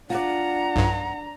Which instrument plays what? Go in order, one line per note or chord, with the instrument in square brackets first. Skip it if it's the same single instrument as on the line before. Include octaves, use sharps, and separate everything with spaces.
[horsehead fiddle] D4 A#5 [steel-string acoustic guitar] F4 D5 [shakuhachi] F#5
[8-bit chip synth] B1 G2